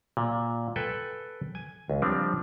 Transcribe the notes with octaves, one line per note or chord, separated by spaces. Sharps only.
A#2
A4 B4 G5 G#5
G#5
C#2
F3 G3 C4 D4